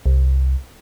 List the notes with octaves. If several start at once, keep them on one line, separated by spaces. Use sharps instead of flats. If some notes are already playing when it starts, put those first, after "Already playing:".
C2